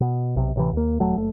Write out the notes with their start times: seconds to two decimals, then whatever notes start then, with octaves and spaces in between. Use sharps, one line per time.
0.01 B2
0.36 B1 C3
0.56 A1 C3 E3
0.73 D#2 A#3
1.00 D#1 F#3 A3
1.16 F#1 A3